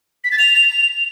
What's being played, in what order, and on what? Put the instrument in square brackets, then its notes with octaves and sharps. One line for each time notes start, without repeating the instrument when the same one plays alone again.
[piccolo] B6
A6
F7